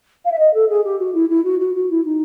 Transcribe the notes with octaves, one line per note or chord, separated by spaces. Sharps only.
F5
E5
D#5
A4
G#4
G4
F#4
E4
E4
F#4
F#4
F#4
E4
D#4